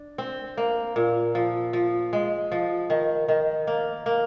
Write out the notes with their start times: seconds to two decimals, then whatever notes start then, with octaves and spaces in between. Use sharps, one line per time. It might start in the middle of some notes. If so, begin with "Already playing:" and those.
Already playing: D4
0.18 C4
0.57 A#3
0.96 A#2
1.35 F3
1.73 F3
2.13 G#3
2.52 F3
2.90 D#3
3.28 D#3
3.67 A#3
4.06 A#3